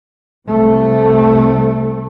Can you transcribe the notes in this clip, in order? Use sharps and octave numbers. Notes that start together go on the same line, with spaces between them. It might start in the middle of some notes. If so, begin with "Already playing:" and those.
C2 C3 A3